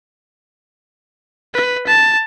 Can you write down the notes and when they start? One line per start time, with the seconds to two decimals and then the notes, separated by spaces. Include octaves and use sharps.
1.54 B4
1.86 A5